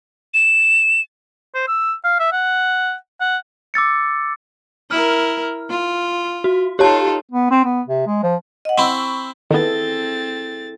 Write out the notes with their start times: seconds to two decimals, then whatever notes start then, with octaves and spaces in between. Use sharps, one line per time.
0.34 E7
1.55 C5
1.68 E6
2.04 F5
2.20 E5
2.33 F#5
3.20 F#5
3.74 D6 E6 A6 C#7
4.91 E4 A#4 F6
5.70 F4
6.44 F#4
6.79 D#4 F4 G4 A4 C#5 A5
7.31 B3
7.51 C4
7.65 B3
7.87 C3
8.07 G#3
8.23 F3
8.65 D#5 F#5
8.78 C4 E4 C#6
9.51 D#3 B3 C4 E4 G#4 A4 A6